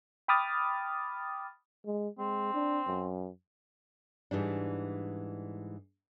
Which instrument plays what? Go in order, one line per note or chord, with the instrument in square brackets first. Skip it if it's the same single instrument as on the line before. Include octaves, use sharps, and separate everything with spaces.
[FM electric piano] G5 B5 D6 D#6 F6 A6
[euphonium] G#3
[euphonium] G#3 [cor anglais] C4
[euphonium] D4
F#2
[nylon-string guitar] G#2 E3 G3 D4